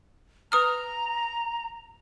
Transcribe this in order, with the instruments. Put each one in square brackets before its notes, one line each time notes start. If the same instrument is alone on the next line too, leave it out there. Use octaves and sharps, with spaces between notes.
[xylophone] B4 D#6 F6 [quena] A#5